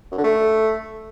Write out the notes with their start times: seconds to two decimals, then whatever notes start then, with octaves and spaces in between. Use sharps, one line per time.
0.12 F#2
0.18 D3
0.24 A3